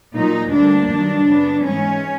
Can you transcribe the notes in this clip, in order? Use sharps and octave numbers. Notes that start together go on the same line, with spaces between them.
A#2 F#3 A#3 D#4
D2 D3 G3 A#3 D4
G2 D#3 F#3
F#2 C#3 F#3 B3
G#2 E3 G#3 C#4